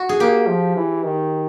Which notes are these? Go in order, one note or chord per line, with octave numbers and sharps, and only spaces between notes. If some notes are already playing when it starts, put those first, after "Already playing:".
Already playing: F#4
G#4
A#3 G4
F3
E3
D#3